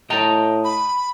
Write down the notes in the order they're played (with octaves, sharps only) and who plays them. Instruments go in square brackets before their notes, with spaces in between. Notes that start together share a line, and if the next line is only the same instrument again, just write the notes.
[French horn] A2 [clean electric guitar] D#5 G5 A#5 [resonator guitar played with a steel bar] A5
[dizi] B5